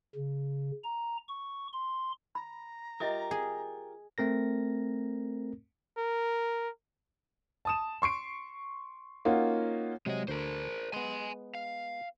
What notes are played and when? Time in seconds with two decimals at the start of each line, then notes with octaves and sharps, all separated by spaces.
0.16 C#3
0.84 A#5
1.29 C#6
1.73 C6
2.35 A#5 B5
3.00 F4 G4 A#4 D#5 E5 D#6
3.31 G#4
4.18 A3 C4 A#4 A#6
5.98 A#4
7.65 A5 D#6 E7
8.02 C6 C#6 C7 D7
9.25 A#3 C#4 D#4 F4 F#4 A#4
10.06 C3 F#3 G#3 D#5
10.28 D2 A#4 C5
10.93 G#3 B3 G#5 C6
11.55 F5